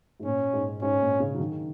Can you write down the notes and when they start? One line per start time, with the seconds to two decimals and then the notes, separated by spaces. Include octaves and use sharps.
0.20 G#2
0.24 A#2 C#4
0.53 G#2
0.82 G#2 C#4
1.01 A#2
1.20 C#3
1.35 F#3
1.40 D#3